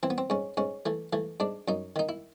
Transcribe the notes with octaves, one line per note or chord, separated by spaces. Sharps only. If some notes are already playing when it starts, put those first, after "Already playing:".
E3 C4
B3
C4
G#2 C#4
G#2 C#4
E3 A3
E3 A3
G#2 D4
F#2 D#4
D#3 D#4
E4